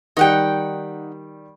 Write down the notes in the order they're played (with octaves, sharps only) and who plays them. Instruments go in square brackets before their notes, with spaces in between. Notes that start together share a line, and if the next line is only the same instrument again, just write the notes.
[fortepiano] D#3 G3 [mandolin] D#4 F#5 G5